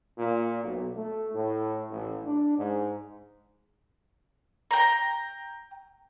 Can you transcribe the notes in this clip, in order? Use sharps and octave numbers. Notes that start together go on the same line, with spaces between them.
A#2
B1
A3
A2
A1
D4
G#2
G5 A#5